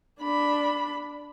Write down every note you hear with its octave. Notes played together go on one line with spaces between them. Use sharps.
D4 B5